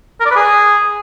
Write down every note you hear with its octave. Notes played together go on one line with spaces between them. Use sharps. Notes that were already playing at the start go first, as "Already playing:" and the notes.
A#4
D5
B4
G#4